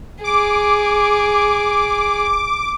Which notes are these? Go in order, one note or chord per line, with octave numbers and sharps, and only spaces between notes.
G#4 D6